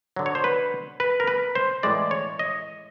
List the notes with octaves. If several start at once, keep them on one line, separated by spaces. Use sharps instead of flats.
D3 F#3
C#5
C5
B4
B4
A#4
B4
C5
A2 E3 G#3 D5
C#5
D#5